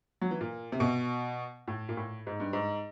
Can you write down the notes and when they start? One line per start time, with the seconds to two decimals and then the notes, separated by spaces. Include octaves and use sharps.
0.21 F#3
0.31 E3
0.41 A#2
0.72 C3
0.80 B2
1.68 A2
1.89 A#2
1.97 A2
2.27 G#2
2.40 G2
2.53 G#2